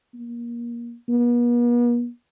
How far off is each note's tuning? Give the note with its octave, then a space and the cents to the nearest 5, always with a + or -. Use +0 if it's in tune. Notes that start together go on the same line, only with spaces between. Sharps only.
A#3 +25
B3 -45